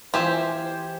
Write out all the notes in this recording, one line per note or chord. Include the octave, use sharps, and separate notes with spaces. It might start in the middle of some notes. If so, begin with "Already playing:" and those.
E3 F4 G4 G#4 C5 E5 G#5